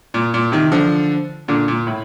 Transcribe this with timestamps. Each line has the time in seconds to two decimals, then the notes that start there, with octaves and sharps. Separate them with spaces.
0.14 A#2
0.34 A#2
0.52 C3 D#3
0.72 D3 F3
1.48 A#2 D3
1.68 A#2
1.87 A2